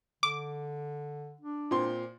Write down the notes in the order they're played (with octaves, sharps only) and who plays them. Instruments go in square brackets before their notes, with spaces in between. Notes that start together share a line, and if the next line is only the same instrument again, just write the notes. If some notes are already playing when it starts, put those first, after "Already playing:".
[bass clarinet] D3 [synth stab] D6
[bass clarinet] D4
[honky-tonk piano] A#2 C4 C6